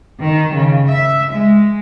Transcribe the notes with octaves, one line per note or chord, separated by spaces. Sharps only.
D#3
C#3
E5
G#3